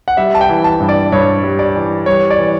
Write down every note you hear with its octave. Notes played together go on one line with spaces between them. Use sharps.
F#5
G3 E5
A5
G5
E3
A5
G2
D5
G2 C#5
G3
D5
E3
G3 C#5
D5
E3